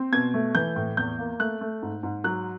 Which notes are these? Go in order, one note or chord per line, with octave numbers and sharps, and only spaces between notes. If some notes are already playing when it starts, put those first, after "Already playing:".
Already playing: C4
B2 G#6
A3
E3 G6
A2
E2 G6
A#3
A3 F#6
A3
G#2
G#2
F#3 F#6